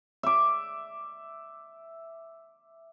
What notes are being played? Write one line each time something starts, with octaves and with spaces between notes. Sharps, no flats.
E5 D6